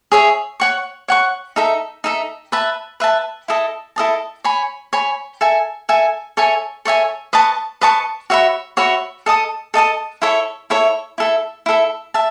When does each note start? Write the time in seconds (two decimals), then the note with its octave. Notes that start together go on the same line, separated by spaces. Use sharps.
0.12 G#4 C#5 E5
0.60 C#5 F#5 C#6
1.08 C#5 F#5 C#6
1.56 D#4 A4 E5
2.04 D#4 A4 E5
2.52 B4 E5 A5
3.00 B4 E5 A5
3.48 E4 A4 D#5 A5
3.96 E4 A4 D#5 A5
4.44 C#5 G#5 B5
4.93 C#5 G#5 B5
5.41 A4 E5 G#5
5.89 A4 E5 G#5
6.37 A4 C#5 E5 G#5
6.85 A4 C#5 E5 G#5
7.33 B4 D#5 A5 C#6
7.81 B4 D#5 A5 C#6
8.30 F#4 C#5 E5 B5
8.77 F#4 C#5 E5 B5
9.26 A4 D#5 A5 D#6
9.74 A4 D#5 A5 D#6
10.22 E4 A4 C#5 E5
10.70 E4 A4 C#5 E5
11.18 E4 A4 E5
11.66 E4 A4 E5
12.14 E5 A5